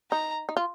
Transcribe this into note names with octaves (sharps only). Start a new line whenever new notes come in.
D#4 A#5
D#4
F4